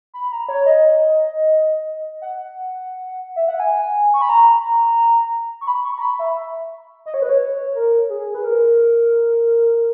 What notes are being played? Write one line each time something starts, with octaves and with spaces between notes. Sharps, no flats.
B5
A#5
C#5
D#5
F#5
E5
F#5
G#5
C#6
B5
A#5
C#6
B5
C#6
A#5
B5
E5
D#5
C#5
B4
C#5
A#4
G#4
B4
A#4